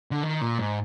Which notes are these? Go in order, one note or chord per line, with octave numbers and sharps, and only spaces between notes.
D3
D#3
A#2
G#2